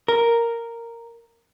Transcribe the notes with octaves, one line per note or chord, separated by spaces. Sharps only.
A#4